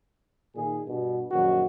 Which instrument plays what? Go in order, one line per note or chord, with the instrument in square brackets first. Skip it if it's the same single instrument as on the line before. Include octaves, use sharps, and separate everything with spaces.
[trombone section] A#2 D#3 G#4
G2 B2
[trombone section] A#1 F#2 D#3 [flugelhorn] F#4